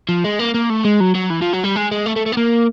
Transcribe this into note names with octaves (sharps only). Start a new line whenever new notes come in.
F3
G#3
A#3
A#3
A3
G#3
F#3
F#3
E3
F3
F#3
G3
G#3
G#3
A3
A3
A3
B3
A#3